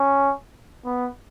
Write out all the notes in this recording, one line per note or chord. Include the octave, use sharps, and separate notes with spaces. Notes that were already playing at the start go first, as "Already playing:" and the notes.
Already playing: C#4
B3